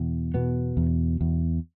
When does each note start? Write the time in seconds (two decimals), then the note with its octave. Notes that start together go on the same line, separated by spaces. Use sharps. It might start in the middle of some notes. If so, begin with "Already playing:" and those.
Already playing: E2 B2
0.34 B2 B3
0.77 E2
1.21 E2